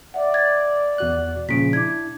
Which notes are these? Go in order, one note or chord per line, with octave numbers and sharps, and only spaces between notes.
D5 E5 F#5
G#6 A6
E2 F#4 F#6
A#2 C#3 F3 B6 D7
D4 E4 D6 G#6